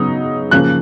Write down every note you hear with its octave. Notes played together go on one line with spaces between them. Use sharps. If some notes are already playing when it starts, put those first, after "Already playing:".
Already playing: C#3 F#3 B3 D#4
C#3 F3 A#3 C#4 F#6